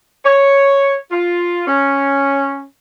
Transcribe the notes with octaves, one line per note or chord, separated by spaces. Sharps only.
C#5
F4
C#4